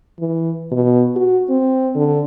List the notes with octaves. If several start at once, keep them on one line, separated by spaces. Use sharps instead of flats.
E3
B2
F#4
C4
D3